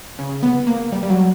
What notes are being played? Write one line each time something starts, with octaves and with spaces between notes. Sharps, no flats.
C#3
B3
A#3
G3
G3
F#3